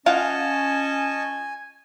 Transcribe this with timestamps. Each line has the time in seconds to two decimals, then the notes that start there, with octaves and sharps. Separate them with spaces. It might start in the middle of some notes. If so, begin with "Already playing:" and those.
0.06 C#4 F4 D#5 F5 F#5 G#5 A5 C#6